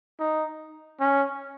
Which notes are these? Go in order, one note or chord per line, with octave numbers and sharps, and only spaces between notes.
D#4
C#4